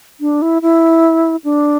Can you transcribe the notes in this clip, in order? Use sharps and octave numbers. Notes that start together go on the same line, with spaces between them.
D4
E4
E4
D4